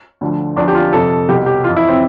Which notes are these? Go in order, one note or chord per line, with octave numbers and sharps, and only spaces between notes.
D2 D3 F3
E2 D3 F3 D4
G4
F4
F2 C3 F3 A4
C2 B2 G4
G4
F2 E3 F4
E4
C4